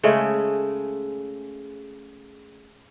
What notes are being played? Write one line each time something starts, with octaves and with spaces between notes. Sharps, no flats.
C#3 G#3 A3